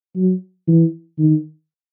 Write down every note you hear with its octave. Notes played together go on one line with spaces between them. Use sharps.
F#3
E3
D#3